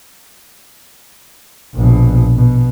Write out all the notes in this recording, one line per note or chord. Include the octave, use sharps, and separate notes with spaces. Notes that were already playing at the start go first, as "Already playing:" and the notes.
A#1 B2
B2